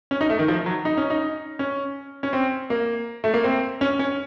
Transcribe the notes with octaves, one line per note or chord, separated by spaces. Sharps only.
C#4
D#4
A3
D#3
F3
F#3
D#4
C#4
D#4
C#4
C#4
C4
A#3
A3
A#3
C4
C#4
C#4